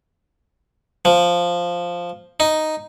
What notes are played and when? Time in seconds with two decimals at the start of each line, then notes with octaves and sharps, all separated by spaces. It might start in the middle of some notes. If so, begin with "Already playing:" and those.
1.05 F3
2.40 D#4